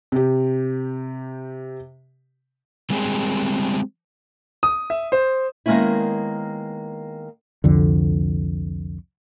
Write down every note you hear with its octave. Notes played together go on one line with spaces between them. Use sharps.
C3 G4
G3 G#3 C4 G4 G#4
D#6
E5
C5
D#3 G#3 A#3 B3 C#4 E4
C2 F2 D3